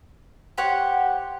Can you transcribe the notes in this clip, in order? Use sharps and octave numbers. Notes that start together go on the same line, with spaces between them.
G4 C5 C#5 F#5